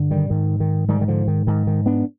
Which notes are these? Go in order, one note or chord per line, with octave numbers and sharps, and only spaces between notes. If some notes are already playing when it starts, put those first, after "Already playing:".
Already playing: G2 D3
D#3 G3
G#2 D#3
D#3
G#2 D#3 G3
D#3
D3 F3
D#3
G#2 D#3
D#3
B3 D4